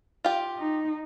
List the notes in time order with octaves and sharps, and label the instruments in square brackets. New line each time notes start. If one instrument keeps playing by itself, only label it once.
[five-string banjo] F4 G4
[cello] D#4